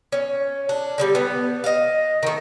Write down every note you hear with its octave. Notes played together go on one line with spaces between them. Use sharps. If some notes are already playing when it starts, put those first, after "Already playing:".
C#4
D4
D3 F3 G3
B3
D#5 F5
D#3 A3